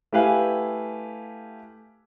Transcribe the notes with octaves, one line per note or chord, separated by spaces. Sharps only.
A3 E4 G4 B4 F5 G#5